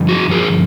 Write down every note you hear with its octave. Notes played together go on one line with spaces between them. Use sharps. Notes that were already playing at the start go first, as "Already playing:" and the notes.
Already playing: G2 D3 F3
F#4 G#4
G#4 A#4